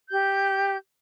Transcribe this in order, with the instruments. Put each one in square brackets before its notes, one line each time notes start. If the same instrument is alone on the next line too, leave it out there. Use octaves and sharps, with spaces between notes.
[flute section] G4 G6